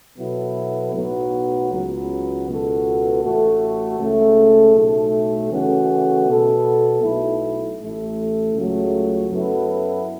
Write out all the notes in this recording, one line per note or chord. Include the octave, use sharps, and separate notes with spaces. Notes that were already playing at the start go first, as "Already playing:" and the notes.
B2 F#3 B3 E4 A4
B1 A2 F#3 B3
C#2 C#3 F#3 B3
C#2 B2 B3 F#4 A4
A1 A2 A3 F#4 A4
C#2 C#3 A3
B1 A2 A3
C#3 E3 A3 C#4 F#4
B2 B3 A4
B1 B2 A3 E4
A1 A2 A3
C#2 C#3 F#3 A3
F#2 F#3 B3 E4 A4